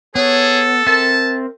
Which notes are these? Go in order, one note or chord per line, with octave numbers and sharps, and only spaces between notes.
B3 G#4 A4 C#5
C4 A#4 E5 A5